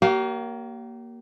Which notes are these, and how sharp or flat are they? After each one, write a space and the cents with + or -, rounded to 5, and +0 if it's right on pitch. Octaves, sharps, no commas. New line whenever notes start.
A#3 +5 G4 -40 C#5 +35